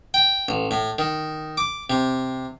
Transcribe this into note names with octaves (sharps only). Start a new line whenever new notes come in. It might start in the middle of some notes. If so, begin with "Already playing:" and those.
G5
A1
A2
D#3
D6
C3